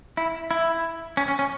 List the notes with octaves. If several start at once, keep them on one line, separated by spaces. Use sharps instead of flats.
E4
E4
C#4
C#4
C#4